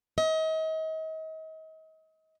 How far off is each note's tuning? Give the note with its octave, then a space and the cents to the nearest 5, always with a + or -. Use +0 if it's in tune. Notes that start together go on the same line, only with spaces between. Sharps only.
D#5 +35